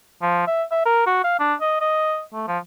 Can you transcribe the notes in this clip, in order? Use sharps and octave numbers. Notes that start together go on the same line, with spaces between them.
F3
E5
E5
A#4
F#4
F5
D4
D#5
D#5
A3
F3